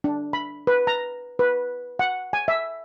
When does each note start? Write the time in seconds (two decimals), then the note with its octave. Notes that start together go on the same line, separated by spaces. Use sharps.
0.04 D4
0.33 B5
0.67 B4
0.87 A#5
1.39 B4
1.99 F#5
2.33 G#5
2.48 E5